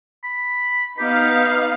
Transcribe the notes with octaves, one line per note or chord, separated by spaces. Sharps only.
B5
B3 D#4 G4 F5